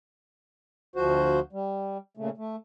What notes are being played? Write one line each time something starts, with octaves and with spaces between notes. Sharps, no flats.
D2 F3 F#4 C5
G3
A#2 C#3 A3
A3